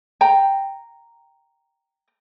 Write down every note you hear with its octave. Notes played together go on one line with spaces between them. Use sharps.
G5 A#5